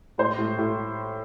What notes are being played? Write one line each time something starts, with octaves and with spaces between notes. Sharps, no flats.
A2 C5
A2
A2